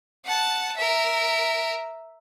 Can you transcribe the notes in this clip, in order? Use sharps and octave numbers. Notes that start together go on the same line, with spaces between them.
F#5 A5
A#4 E5